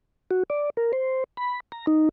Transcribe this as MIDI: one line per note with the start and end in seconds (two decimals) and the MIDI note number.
0.31 0.43 66
0.50 0.70 74
0.77 0.92 70
0.93 1.24 72
1.37 1.60 83
1.72 1.86 82
1.87 2.09 63